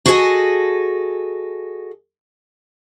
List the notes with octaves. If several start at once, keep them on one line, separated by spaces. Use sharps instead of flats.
F#4 G#4 A4 C5 D#5 G#5